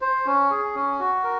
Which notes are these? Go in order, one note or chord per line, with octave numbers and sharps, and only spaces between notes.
C5
C#4
G#4
C#4
F#4
A#4